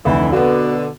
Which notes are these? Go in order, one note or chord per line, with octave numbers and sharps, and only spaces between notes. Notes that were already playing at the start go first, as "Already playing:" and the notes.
F1 D2 E3 E4
B2 D3 B3 F#4